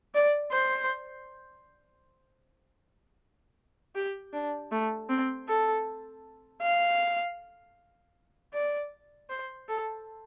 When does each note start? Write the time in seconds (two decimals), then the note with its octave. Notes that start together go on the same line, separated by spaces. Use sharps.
0.14 D5
0.52 C5
3.95 G4
4.34 D4
4.71 A3
5.09 C4
5.48 A4
6.62 F5
8.53 D5
9.30 C5
9.68 A4